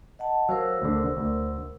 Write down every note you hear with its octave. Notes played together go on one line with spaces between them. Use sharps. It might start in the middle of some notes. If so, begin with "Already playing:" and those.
D#5 F#5 A5
F#3 A#4 C5 F5 E6
D2 D3
D2